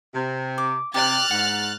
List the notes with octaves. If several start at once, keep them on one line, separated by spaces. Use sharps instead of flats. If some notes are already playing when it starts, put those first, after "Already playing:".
C3
D6
C3 G4 F6 F#6 A6
G#2 F#5